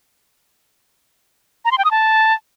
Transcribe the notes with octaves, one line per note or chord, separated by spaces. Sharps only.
A#5
C6
G5
D#6
A5